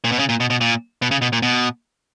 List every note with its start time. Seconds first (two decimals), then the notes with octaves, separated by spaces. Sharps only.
0.04 A#2
0.12 B2
0.19 C#3
0.29 A#2
0.40 B2
0.50 B2
0.61 A#2
1.02 B2
1.11 C#3
1.22 B2
1.33 A#2
1.42 B2